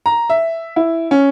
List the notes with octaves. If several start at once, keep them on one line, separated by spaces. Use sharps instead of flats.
A#5
E5
E4
C#4